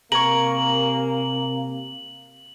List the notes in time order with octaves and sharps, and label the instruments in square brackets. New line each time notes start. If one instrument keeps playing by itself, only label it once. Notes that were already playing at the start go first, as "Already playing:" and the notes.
[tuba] C3 [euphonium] A#3 [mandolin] A#4 G#5 C#6 [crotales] F#7